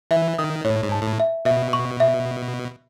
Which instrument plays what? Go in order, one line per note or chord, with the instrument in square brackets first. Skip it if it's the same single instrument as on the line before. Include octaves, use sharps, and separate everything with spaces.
[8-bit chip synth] E3 [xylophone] E5
[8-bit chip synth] D#3 [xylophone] D#6
[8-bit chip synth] A2 [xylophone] C#5
[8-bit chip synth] G#2
[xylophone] A5
[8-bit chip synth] A2
[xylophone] E5
[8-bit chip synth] B2 [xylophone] E5
[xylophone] C#6
E5